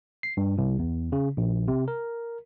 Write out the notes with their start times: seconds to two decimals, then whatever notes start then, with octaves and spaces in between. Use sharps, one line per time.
0.23 C7
0.37 G2
0.58 C2
0.79 E2
1.12 C#3
1.37 A#1
1.68 C3
1.88 A#4